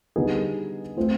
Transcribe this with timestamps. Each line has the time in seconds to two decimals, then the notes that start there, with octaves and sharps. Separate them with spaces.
0.16 D3 G3 B3 D#4 G#4
0.97 A3 C4 F4